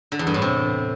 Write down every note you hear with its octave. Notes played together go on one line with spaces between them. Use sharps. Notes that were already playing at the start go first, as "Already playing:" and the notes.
D3
E2
G2
A2
C3